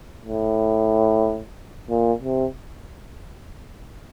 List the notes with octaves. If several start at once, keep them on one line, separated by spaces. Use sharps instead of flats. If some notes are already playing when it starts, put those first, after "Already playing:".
A2
A#2
C3